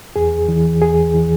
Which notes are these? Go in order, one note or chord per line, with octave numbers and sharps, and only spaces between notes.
E2 G#4
E3
E2 G#4
E3